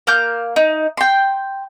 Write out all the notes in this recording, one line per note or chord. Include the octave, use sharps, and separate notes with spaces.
A#3 F6 G6
D#4
G5 C6